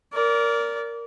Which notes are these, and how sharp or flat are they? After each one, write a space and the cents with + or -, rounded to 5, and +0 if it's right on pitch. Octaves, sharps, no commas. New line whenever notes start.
A#4 +0 D5 -25